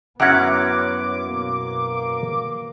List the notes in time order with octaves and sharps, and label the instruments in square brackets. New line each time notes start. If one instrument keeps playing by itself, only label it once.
[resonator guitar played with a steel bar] F#2 F#5 [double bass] B3 [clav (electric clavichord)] C#4 E4 F#4 [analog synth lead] D6
[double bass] B2 A#3